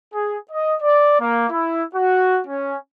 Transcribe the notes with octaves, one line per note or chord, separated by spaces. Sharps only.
G#4
D#5
D5
A#3
E4
F#4
C#4